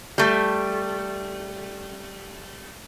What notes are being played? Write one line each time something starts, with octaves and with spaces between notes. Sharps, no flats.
G3 A3